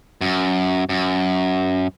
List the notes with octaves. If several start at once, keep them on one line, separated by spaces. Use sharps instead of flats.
F#2
F#2